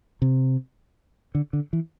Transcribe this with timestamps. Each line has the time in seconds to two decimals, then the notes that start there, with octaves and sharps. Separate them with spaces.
0.22 C3
1.35 D3
1.53 D3
1.73 E3